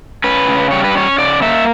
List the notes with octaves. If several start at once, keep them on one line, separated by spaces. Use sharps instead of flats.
C#4 B4
C#3
G3 C#5
B4
C#4 C#5
C#3 D5
A#3 E5